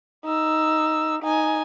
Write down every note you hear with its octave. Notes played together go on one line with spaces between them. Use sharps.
D#4 E6
D#4 G#5